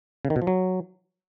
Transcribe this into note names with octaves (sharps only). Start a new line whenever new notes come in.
C#3
D#3
B2
F3
F#3